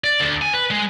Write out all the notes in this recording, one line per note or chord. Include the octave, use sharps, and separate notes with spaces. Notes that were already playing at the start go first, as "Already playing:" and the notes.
D5
D2
G#5
B4
G#3